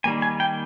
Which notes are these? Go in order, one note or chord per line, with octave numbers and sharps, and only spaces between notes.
D#3 G3 A#3 G#5
G#5
G5